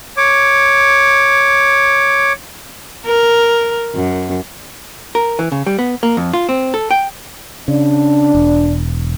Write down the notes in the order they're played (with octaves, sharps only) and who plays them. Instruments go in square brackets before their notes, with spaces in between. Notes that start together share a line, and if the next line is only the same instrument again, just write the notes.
[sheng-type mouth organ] C#5 D6
[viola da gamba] A#4
F#2
[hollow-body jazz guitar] A#4
E3
C#3
G3
B3
A#3
F2
F4
C4
A4
G5
[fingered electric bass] C#3 [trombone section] D4
[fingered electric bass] E1